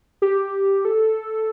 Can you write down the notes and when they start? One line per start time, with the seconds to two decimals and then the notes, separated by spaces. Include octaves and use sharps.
0.22 G4
0.85 A4